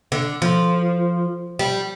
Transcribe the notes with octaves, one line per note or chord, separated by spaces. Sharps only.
D3
F3
G3